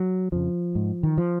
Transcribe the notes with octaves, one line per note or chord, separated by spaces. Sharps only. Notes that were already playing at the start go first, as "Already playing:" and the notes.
Already playing: F#3
F2 C#3 F3
G#2
D#3
F3